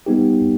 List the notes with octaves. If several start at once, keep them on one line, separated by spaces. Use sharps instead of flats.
G3 B3 D#4 G4